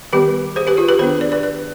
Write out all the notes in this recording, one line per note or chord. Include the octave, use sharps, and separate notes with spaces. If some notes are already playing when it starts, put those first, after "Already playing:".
D#3 G3 B3 G4 B4
G#4 C5
G4 B4
F4 G#4
G4 B4
D#3 B3 D4 G#4 C5
B4 D5
B4 D5
B4 D5